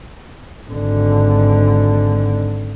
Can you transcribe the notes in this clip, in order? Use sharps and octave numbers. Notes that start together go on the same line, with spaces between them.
G#1 D3